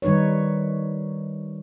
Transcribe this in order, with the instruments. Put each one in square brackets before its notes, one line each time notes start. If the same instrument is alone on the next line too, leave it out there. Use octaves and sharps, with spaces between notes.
[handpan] D#3 G3 D#4 B4 C#5